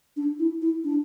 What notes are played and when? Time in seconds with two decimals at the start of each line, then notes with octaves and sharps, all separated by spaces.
0.17 D4
0.39 E4
0.62 E4
0.84 D4